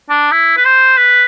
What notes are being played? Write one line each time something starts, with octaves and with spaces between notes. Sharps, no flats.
D4
E4
B4
C5
B4